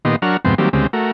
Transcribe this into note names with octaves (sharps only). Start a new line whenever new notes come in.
A#2 D#3 B3 G4 D#5 C6
F#3 D4 A#4 F#5 C#6 F6
F2 G#2 C3 B3 G5 C6
D#3 F#3 G3 A#3 C4 G4
D2 C#3 G#3 C4 G4
A3 F#4 A#4